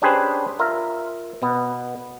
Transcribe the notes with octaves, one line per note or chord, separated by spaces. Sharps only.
C#4 D4 G4 G#4 B4 C5
F4 A#4 E5
B2 B3